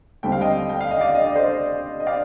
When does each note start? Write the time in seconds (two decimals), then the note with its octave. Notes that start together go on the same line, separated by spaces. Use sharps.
0.23 D#2 D3 G3 C4 G5
0.32 F5
0.41 D#5 G5
0.69 G5
0.81 F5
0.91 D#5
1.01 D5 F5
1.15 D#5
1.26 D5
1.36 C5 D#5
2.00 D#5
2.06 D5 F5